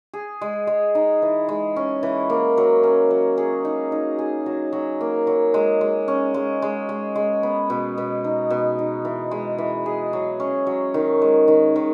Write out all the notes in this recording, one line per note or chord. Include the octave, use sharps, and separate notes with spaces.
G#4
G#3
G#3
D#4
E3
G#3
C#4
E3
A#3
F#3
C#4
F#3
G#4
D#4
D#4
G#4
F#3
F#3
A#3
F#3
G#3
G#3
C#4
G#3
G#3
G#3
G#3
B3
B2
B2
D#4
B2
D#4
E3
G#3
E3
G#4
F#3
C#4
F#3
D#3
G#3
D#3
D#3